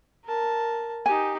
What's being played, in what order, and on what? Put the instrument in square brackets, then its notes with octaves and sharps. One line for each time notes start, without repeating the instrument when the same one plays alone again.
[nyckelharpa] A#4 A5
[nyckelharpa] D#4 G4 [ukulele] G#5